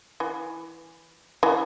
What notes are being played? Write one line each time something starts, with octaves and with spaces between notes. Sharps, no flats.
E3
E3